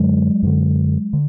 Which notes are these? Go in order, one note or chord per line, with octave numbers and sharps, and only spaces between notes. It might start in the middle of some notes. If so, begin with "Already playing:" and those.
Already playing: F#2 D3 F#3 G#3
F#2 D3
D3